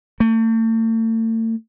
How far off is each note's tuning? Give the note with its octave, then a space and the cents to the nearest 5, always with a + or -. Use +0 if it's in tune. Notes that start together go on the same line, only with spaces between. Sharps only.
A3 +40